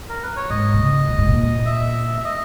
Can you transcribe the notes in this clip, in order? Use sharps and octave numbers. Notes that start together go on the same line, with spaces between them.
A#4
B4
C#5
G#2 D#5
B2
C#3
A#2
G#2
A#2
E5
E5
D#5